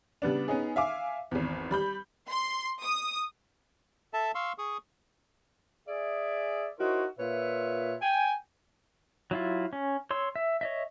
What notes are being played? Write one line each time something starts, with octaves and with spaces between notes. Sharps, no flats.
C#3 G3 B3 D4
B3 C#4 D#4 G#4
E5 F5 G#5 D6
G#1 E2
G3 B5 G6
C6
D#6
A4 E5 A5
F5 C6 C#6 E6
G#4 C#6 D#6
G#4 D5 E5
D#4 E4 F#4 A#4 C5 C#5
A#2 F4 B4 C#5 E5
G5 G#5
F#3 E4 F4
C#4
C#5 C6 E6
E5
C#5 D#5 E5